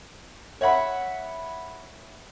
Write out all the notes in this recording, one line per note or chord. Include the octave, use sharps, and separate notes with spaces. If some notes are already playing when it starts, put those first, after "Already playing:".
C#5 E5 F#5 B5